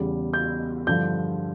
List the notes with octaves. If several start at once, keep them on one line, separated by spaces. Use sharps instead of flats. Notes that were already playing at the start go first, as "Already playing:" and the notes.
Already playing: E2 C#3 G3
G6
G2 D3 F3 G6